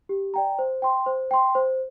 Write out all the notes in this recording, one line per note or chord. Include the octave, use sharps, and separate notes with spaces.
G4
D5 G5 A#5
C5
G5 C6
C5
G5 C6
C5